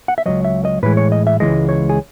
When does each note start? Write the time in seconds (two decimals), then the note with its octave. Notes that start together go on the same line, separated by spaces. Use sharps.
0.08 F#5
0.18 E5
0.26 C#2 B2 F#3 D#5
0.45 E5
0.65 D#5
0.83 A2 E3 G#3 B4
0.97 C#5
1.12 D#5
1.27 E5
1.40 C#2 C#3 E3 G#3 D#5
1.69 C#5
1.89 G#4